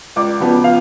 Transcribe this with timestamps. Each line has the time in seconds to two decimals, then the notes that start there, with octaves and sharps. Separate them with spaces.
0.16 C#2 D5 D6
0.40 C#3 F3 B3
0.64 F5